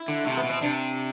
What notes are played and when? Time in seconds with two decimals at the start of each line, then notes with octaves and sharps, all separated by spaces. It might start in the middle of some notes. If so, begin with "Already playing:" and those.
Already playing: E4
0.08 D3
0.25 C3 A3
0.37 B3
0.44 B2
0.50 C4
0.62 C3 D4